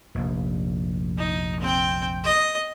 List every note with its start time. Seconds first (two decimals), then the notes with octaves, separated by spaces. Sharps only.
0.15 F1 A#1
1.18 D#4
1.60 C4 G5
2.24 D#5